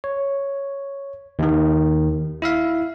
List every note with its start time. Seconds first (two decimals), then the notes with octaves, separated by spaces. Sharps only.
0.04 C#5
1.39 D#2 D#3
2.42 E4 E5 F5